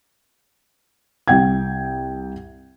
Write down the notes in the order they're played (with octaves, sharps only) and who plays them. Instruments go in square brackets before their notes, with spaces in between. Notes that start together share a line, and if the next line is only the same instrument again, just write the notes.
[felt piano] C2 G5 G#6